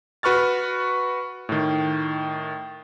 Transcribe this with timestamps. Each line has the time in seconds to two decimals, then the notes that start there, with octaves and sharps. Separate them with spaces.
0.23 F#4 B4 C#6 F6 A6
1.49 A2 D#3